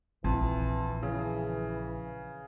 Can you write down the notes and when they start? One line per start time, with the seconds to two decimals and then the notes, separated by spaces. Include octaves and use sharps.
0.24 A#1 F2 E3
1.03 C#3 E3